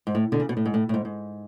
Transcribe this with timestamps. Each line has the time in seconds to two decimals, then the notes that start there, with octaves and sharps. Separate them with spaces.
0.07 G#2
0.15 A2
0.32 B2 D3
0.40 C#3
0.49 B2
0.57 A2
0.66 G#2
0.74 A2
0.89 A2
0.94 G#2
1.05 G#2